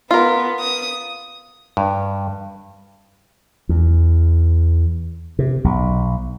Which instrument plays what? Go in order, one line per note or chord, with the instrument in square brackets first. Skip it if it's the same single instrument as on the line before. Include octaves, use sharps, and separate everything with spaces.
[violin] B3 [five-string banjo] F4 A#4
[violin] D#6
[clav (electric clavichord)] G2
[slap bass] E2
C3
B1